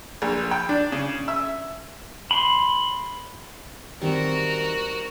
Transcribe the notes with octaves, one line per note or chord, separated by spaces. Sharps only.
A#1
G5
D4
C#3
E5
B5 C6
D#3 G3 C4 F#4 A#4 E5